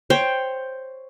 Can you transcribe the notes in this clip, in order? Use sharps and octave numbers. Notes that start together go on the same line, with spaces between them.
C5 C#5 G5